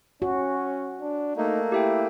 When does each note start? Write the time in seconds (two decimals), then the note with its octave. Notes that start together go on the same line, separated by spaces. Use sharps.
0.22 C#4 F#4
1.01 D4
1.37 A3 A#3 D#4
1.72 E4 G4 E5 G5